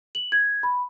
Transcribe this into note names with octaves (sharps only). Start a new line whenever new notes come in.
F#7
G#6
B5